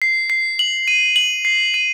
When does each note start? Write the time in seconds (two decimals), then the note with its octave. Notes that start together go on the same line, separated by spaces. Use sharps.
0.02 C7
0.30 C7
0.59 F#7
0.88 D#7
1.16 F#7
1.45 C7
1.74 D#7